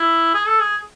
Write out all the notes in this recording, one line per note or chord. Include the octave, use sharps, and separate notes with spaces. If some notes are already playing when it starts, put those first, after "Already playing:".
Already playing: E4
G#4
A4
G#4